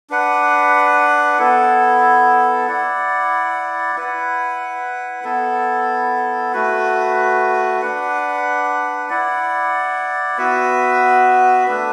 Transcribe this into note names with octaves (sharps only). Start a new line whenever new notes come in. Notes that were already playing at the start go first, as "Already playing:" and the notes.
D4 B4 F#5
B3 E4 A4
E4 D5 F#5
E4 B4 F#5
B3 E4 A4
A3 F#4 B4
D4 B4 F#5
E4 D5 F#5
B3 F#4 B4 E5
A3 D4 B4 E5